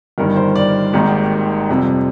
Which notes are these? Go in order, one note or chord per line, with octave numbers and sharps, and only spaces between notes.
G1 G2 D#3 A#4
C5
D5
G#1 G#2 D#3 G3 A#3 G4
F2 C3 G3